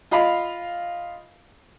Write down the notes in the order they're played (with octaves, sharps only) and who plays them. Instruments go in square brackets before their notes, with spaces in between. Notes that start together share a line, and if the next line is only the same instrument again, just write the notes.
[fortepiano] F4 D#5 F5 B5